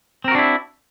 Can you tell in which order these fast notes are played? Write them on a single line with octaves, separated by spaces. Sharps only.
C4 A#4 F#4 D4 E4